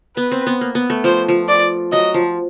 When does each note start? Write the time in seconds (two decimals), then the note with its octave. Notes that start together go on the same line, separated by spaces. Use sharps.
0.16 B3 B4
0.32 C4
0.47 B3
0.61 A#3
0.75 B3
0.90 A3
1.04 F3 C5
1.28 F3
1.48 D5
1.92 F#3 D#5
2.14 F3